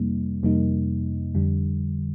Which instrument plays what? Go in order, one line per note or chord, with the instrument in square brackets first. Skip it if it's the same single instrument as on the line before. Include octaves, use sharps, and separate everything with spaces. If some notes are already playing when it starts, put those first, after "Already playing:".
Already playing: [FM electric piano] F2 C3 G3 A#3 D#4
F2 C3 G3 A#3 D#4
F2 D3 G3